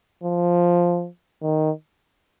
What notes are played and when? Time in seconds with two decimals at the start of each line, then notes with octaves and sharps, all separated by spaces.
0.24 F3
1.43 D#3